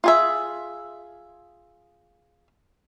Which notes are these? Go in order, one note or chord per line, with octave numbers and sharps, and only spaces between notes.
F4 G#4 E5